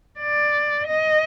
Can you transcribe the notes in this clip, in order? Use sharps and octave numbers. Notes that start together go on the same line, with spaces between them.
D5
D#5